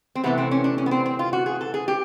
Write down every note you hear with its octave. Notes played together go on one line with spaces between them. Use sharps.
C4
C3 E3 A3 B3
C4
C#4
D4
C#4
B3
C4
C4
F4
F#4
G#4
A4
G#4
G4